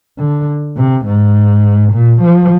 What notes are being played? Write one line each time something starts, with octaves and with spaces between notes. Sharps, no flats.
D3
C3
G#2
A#2
F3